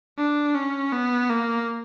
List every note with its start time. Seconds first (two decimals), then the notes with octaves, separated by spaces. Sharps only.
0.18 D4
0.55 C#4
0.92 B3
1.30 A#3